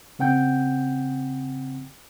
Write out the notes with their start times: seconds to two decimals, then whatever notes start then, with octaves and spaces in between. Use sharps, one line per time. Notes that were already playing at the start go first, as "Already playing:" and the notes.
0.19 C#3 C4 F#5 G5 G6